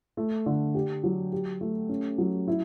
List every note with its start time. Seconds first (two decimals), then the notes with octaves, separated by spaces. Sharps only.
0.17 A3
0.46 D3
0.74 G4
1.03 F#3
1.32 G4
1.61 A3
1.89 C#4
2.18 F#3
2.48 E4